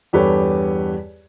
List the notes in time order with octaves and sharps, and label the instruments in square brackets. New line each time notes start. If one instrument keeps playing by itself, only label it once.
[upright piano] E2 G2 G4 A4 B4 C#5